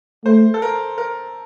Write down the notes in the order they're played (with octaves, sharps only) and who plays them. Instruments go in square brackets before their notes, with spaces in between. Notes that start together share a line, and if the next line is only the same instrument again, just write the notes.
[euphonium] A3 [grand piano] C5
[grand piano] A4
A#4
A#4